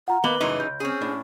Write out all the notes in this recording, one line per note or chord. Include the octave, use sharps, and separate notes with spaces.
F4 F#5 A#5
D#3 A#3 B3 B4 D6 F#7 G7
F#2 A2 C#3 E3 D#4 C6
C#2 G6
C4 C#4 G#4
A2 D4